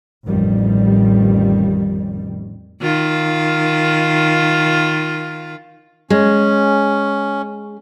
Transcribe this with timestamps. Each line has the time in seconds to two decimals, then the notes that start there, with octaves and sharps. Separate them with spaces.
0.25 A1 F2 D#3 G3
2.82 D#3 F4
6.10 G#3 C#4